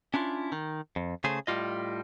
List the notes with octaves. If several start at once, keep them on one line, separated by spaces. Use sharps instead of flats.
C#4 D4 E4 F4
D#3
F2
C#3 A3 G#4 C5
A2 G3 F4 D#5